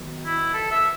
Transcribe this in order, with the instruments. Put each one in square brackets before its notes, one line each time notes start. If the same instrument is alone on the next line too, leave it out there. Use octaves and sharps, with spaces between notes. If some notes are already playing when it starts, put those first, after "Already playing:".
Already playing: [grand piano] D#3 F#3 B3
[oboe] E4
A4
E5